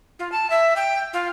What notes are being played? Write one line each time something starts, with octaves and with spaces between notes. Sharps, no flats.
F4
A5
E5
G5
F4